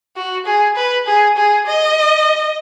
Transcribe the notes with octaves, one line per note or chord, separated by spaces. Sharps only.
F#4
G#4
B4
G#4
G#4
D#5